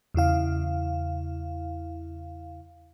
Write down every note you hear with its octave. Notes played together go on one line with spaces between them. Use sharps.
E2 C#3 E4 F5